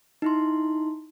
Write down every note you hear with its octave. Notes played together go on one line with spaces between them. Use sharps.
D#4 E4 C6